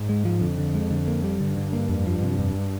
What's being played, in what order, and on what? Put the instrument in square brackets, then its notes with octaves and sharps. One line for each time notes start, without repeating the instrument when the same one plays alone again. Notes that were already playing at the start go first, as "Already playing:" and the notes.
Already playing: [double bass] G#2
[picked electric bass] G#3
F3
[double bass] F2 [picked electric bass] D3
[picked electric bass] D3
G#3
D3
A#3
G3
[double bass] G2 [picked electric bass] D3
[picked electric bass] D3
A#3
F2
F3
C3
F2